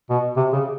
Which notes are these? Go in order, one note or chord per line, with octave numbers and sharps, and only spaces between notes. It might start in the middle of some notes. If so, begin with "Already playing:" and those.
B2
C3
C#3